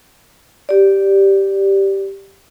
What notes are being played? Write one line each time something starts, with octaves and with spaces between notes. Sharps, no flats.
G4 D5